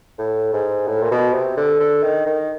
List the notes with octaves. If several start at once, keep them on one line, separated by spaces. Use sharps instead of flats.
A2
G#2
A2
A#2
B2
C3
D3
D3
D#3
D#3